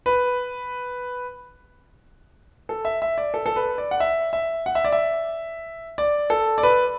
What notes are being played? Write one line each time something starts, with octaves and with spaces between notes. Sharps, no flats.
B4
A4
E5
E5
D5
A4
A4
B4
D5
F#5
E5
E5
F#5
E5
D5
E5
D5
A4
D5
B4